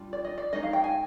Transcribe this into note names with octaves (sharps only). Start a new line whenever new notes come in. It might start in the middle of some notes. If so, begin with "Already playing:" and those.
Already playing: G3 D4 F4
D5
D#5
D5
G#3 D#4 D#5
F5
G5
G#5